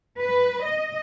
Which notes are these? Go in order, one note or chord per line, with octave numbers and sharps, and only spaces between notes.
B4
D#5